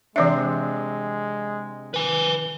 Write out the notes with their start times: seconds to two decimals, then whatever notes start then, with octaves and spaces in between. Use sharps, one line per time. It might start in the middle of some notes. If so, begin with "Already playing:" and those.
0.16 C3 E3 G#3 C4 D4 D5 E5
1.94 B4 G#5